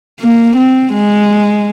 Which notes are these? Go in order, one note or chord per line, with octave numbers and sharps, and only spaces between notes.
A#3
C4
G#3